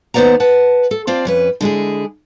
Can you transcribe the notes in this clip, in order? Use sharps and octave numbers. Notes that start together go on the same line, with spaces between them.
D#2 B3 C5 D5 F#5 A#5
B4 F#5 A5
A4
C4 F4 D5 A5
F2 C#4 B4
D3 G#3 E4 G#4